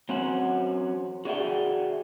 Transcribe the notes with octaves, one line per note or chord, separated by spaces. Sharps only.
F#3 C4 C#4 F#4 F#5
F#4 G#4 D5 E5 F#5 G5